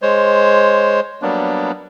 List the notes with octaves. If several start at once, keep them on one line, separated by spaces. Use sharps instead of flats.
G#3 C5 C#5
F#3 G3 A#3 B3 D4